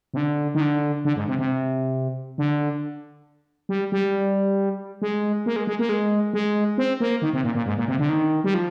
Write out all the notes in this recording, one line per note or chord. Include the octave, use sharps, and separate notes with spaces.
C3
D3
D#3
D3
D3
G#2
C3
C3
D3
G3
G3
G#3
A#3
G#3
G#3
A#3
G#3
G#3
C4
A#3
D#3
C3
A#2
A#2
G#2
A#2
C3
D3
D#3
G3
F3